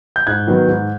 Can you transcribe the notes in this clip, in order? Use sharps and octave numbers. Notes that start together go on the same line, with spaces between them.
G6
G#2 F#6 G#6
D#3 F#3 B3
G#2